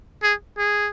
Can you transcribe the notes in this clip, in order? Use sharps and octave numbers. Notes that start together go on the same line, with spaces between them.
G#4
G#4